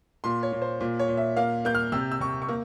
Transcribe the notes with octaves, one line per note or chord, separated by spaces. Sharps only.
A#2 C6
C#5
A#2
C5
A#2
C#5
A#2
E5
A#3 F5
A#3 G6
F6
C3 E6
E6
C3 C#6
C#6
A#3